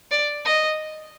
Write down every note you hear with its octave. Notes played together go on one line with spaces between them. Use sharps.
D5
D#5